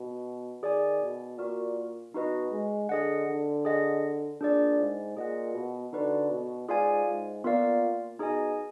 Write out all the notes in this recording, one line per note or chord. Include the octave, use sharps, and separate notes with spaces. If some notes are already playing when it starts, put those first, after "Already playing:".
Already playing: B2
D#3 G#4 D5 G#5
B2
A#2 F#4 A#4 D5
B2 D#4 F#4 B4 D#5
G#3
D3 G#4 D#5 F#5
D3
G#4 D#5 F#5
A#2 D4 G#4 D5
G#2
A#2 G#4 D#5 F#5
B2
D3 D#4 F#4 B4 D5
B2
G#2 F4 G#4 D5 F5 G#5
G#2
A#2 B3 F4 A#4 D5 F5
B2 D#4 G#4 D#5 G#5